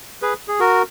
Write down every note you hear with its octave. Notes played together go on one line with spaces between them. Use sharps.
G#4 B4
G#4
F#4 A#4